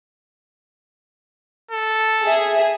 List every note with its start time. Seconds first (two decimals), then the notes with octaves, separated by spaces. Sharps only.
1.71 A4
2.25 G#4 E5